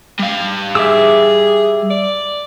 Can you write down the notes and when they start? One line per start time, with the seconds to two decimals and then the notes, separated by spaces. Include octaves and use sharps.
0.20 G3 F5
0.75 G#4 E5 D6 E6
1.90 D5